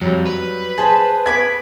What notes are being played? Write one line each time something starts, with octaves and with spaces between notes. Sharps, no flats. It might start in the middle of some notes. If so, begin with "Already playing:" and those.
F2 F#3 G3
B4
G#4 C5 A5 B5
B3 G#5 B5 D6 G#6